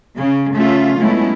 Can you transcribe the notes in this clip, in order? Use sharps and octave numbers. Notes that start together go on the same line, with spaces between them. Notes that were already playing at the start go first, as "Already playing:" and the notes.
C#3
C#3 A3 C#4 F4 E5
F#3 G#3 A3 B3 C#4 E4